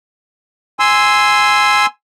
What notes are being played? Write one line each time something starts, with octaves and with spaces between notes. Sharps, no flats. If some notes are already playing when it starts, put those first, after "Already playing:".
G#5 C6 E6